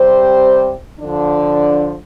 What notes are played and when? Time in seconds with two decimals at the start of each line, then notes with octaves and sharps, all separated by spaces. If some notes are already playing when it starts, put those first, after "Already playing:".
Already playing: C3 G3 C4 G4 C5
1.00 D3 F3 D4